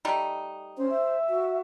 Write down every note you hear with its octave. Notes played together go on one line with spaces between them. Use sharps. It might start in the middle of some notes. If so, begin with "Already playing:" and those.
G3 A3 D#4
C#4 C5
E5
F#4